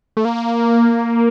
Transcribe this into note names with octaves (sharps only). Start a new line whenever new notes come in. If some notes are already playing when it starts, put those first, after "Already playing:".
A3
A#3